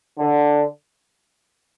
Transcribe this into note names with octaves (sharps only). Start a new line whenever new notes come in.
D3